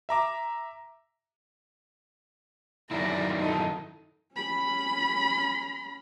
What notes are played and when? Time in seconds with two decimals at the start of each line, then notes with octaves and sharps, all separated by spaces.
0.09 E5 A#5 D6
2.91 F#2 D#3 E4 D5 A#5
3.40 D#4 A4
4.35 C#4 B5